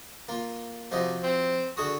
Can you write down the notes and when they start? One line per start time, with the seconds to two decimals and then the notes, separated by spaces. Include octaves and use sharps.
0.29 A#3 F4
0.92 C3 F3 F#4 D#5
1.23 C4
1.77 D3 F#4 G#4 D#6